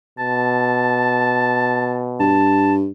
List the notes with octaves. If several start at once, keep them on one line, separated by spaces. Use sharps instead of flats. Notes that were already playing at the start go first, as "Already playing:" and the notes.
B2 A5
G2 A5